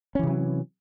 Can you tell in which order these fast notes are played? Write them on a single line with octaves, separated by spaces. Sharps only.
C#4 E3 C3 F#3